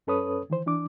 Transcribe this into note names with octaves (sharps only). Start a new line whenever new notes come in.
F#2 C#4 A4 B4 C#5 D#6
D#3 E3 C5
E3 D4 D6